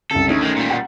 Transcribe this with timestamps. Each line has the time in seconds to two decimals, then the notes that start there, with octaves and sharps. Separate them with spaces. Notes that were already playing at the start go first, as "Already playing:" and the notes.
0.11 C2 C#3 A4
0.28 D2 A3 C#4 D#4
0.42 D#3 G#3
0.56 A#2 G3
0.70 F#5